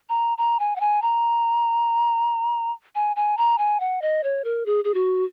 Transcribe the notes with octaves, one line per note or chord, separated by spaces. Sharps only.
A#5
A#5
G#5
F#5
G#5
A#5
G#5
G#5
A#5
G#5
F#5
D#5
C#5
A#4
G#4
G#4
F#4